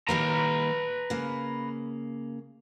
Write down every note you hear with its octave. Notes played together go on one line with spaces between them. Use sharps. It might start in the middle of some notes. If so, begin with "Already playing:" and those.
D#3 G3 A#3 B4 A#5
C#3 A#3